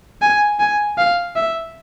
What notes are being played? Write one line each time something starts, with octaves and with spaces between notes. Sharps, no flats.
G#5
G#5
F5
E5